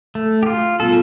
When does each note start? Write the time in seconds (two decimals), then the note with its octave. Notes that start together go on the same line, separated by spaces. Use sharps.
0.15 A3
0.43 G4
0.46 F4
0.79 B2 G3 B3 F4 A4